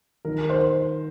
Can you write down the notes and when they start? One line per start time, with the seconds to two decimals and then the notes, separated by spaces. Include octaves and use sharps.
0.25 D#3 A#4
0.50 C5